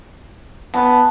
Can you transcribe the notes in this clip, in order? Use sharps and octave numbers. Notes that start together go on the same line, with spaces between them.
B3 A5